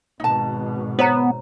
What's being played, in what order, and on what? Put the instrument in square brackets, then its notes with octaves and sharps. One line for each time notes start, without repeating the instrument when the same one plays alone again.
[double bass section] G#1 B2 [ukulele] D#4 A5
[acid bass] B3 [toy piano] C5 C#5 A#5